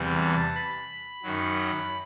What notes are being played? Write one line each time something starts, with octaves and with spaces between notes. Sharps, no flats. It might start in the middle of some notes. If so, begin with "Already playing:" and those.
Already playing: E2 C3 E3 G3
A5
B5
F#2 D#3 F#3